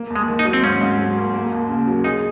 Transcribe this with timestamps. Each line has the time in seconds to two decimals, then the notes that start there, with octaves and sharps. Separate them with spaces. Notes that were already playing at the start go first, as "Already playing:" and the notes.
Already playing: A#3
0.10 D#2
0.16 G#3
0.28 D#3
0.39 D#4
0.45 F#3
0.53 C4
0.63 G#2 C#4
0.81 G#2
0.98 F#3
1.17 A#3
1.34 A#3
1.52 D#2
1.69 C#3
1.87 F#3
2.04 D#4 G#4